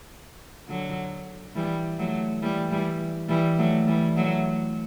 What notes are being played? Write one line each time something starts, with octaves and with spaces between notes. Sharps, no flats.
D3 F#3
E3 G3
F#3 A3
E3 G3
E3 G3
E3 G3
F#3 A3
E3 G3
F#3 A3